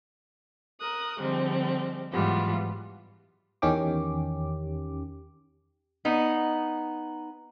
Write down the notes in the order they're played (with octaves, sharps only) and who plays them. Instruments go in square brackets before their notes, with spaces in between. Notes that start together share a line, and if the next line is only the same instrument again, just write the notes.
[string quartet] A#4 D#6 F#6
D3 F3 G3 G#3 C4
G#2 E3 F#3 G3 B3 F4
[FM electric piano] E2 D#3 C#4 G4 D6
[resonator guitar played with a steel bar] B3 D#4